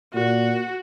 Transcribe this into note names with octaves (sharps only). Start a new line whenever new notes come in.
A#2 F#4